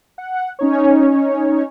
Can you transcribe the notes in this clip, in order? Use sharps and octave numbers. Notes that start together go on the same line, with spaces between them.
F#5
C#4 D#4 C#5